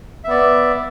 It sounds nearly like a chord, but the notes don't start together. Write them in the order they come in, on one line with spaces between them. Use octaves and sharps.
E5 B3 D5